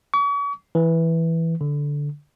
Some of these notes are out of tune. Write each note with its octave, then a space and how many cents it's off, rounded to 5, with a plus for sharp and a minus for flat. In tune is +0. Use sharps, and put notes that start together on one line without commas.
C#6 +40
E3 -5
D3 -10